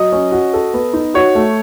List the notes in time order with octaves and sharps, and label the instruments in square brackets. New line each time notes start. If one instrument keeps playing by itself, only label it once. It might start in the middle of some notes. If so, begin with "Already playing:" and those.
Already playing: [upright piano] F#3 [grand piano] D#5
[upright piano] C#4
F#4
A4
B3
D#4
[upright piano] F#4 [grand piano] C#5
[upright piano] A3